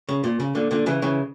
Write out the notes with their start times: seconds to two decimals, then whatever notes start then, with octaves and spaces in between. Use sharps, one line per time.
0.09 C#3
0.24 A#2
0.40 C#3
0.55 A#2 D3
0.71 A#2 D3
0.86 C#3 E3
1.02 C#3 E3